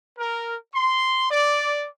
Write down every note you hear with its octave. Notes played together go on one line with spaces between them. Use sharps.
A#4
C6
D5